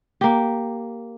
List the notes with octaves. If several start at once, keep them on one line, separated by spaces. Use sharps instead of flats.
A#3 G4